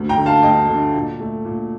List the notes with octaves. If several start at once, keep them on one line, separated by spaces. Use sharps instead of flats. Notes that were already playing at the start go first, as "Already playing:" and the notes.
Already playing: D2
G5 A#5
D3 A3
F5 A5
D2 D#5 G5
D3 A3
A#2
A3
A#2